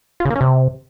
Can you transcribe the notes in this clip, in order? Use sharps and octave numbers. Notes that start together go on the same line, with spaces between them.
F4
C#3
A#3
C#4
C3